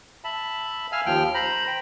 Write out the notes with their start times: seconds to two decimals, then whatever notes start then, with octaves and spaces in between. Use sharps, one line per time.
0.24 E5 A5 B5
0.92 E5 F5 G#5 E6 F6
1.06 D#2 F3 G5 F6
1.34 C5 A#5 B5
1.67 G5 B5